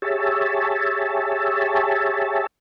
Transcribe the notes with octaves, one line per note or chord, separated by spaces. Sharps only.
G4 G#4 C#5 E5 A5